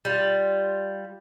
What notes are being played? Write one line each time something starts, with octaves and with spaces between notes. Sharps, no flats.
G3 F4